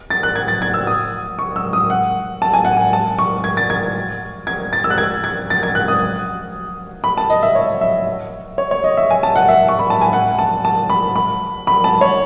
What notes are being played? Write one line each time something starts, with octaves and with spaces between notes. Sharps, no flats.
A6
F#6
G#6
A6
G#6
E6
D#6
C#6
E6
D#6
F#5
A5
G#5
F#5
G#5
A5
C#6
G#6
A6
G#6
G#6
A6
E6
F#6
G#6
G#6
A6
G#6
F#6
D#6
B5
A5
D#5
E5
C#5
E5
C#5
C#5
D#5
E5
G#5
A5
F#5
E5
C#6
B5
A5
G#5
F#5
A5
A5
B5
B5
B5
A5
C#5